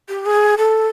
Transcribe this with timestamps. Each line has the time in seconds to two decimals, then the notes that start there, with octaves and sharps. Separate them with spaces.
0.09 G4
0.26 G#4
0.58 A4